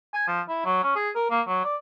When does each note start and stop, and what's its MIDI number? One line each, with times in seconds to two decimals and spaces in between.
0.14 0.27 80
0.28 0.41 53
0.48 0.63 64
0.65 0.80 54
0.84 0.94 61
0.96 1.10 68
1.16 1.27 70
1.30 1.41 58
1.48 1.64 54
1.64 1.76 74